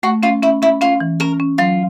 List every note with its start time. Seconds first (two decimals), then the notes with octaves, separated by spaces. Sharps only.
0.03 A3 F#4
0.23 C#4 F4
0.43 C#4 E4
0.62 C#4 E4
0.81 C#4 F4
1.00 E3
1.20 C#4 A#4
1.40 C#4
1.58 F#3 F4